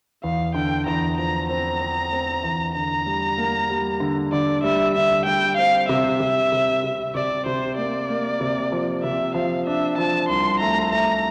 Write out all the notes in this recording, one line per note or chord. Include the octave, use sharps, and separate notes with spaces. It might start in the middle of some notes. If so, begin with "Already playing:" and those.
E2 F5
D3 G5
E2 A#5
F3 A#5
C4 A#5
C4
C4
E2
D3 A#5
G3
A#3
G3
D3
D3 D5
G3 E5
D3 E5
G3 G5
C4 F5
C3 E5
C3
C3
C3
C3 D5
C3 C5
A#3 D5
A#3
C3
F3
C3 E5
F3 F5
D4 E5
F3 A5
C2 C6
A3 A#5
A3 A#5